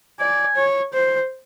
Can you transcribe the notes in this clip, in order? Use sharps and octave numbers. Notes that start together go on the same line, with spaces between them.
D5 G#5
C#5
C5